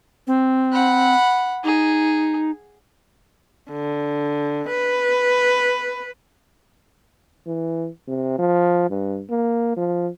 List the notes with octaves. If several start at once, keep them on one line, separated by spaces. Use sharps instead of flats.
C4
F#5 B5
D#4 G#4
D3
B4
E3
C3
F3
G2
A#3
F3